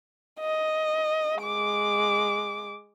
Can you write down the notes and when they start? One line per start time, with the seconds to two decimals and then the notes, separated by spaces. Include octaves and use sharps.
0.41 D#5
1.40 G#3 D6